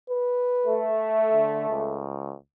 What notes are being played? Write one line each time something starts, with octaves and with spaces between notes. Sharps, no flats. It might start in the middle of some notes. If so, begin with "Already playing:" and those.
B4
A3
D3
C#2